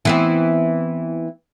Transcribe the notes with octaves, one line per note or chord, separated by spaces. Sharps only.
E3 B3 C4